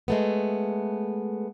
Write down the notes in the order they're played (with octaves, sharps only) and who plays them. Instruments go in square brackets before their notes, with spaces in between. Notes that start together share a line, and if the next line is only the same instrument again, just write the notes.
[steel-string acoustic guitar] G#3 A3 B3